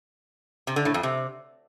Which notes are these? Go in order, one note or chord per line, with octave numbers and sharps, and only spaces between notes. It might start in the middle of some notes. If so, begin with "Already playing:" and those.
C3
D3
A2
F2
C3